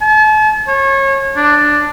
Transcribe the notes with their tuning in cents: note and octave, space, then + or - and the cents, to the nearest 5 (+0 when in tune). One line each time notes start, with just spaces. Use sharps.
A5 -40
C#5 -30
D4 +5